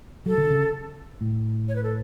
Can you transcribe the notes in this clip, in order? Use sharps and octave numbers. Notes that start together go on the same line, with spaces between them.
F#3 A4
D3
C#3
A2
C#5
B4
A4